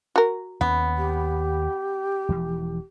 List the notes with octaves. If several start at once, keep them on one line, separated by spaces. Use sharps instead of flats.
F#4 A#4
D#2 B3 C#4
G4
E1 E3 F3